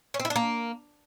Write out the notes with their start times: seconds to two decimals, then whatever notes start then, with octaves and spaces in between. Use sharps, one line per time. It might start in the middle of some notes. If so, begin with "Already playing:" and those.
0.14 C#4
0.20 C4
0.25 E4
0.30 D4
0.36 A#3